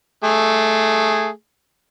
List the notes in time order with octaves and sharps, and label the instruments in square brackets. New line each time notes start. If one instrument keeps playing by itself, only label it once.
[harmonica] A3 G#4